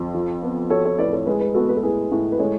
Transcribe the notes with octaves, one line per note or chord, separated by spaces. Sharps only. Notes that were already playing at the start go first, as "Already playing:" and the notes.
Already playing: F2
F3
B3
F#4 A4 C#5
A4 C#5
A2 B4 D5
A4 C#5
G#3 G#4 B4
G#4 B4
B3 F#4 A4
B4
A4
A2 G#4 B4
A2
B4
G#3 A4 C#5